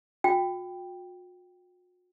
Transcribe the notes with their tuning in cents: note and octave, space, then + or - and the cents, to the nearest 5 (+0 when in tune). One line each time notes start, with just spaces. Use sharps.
F#4 -45 G5 +0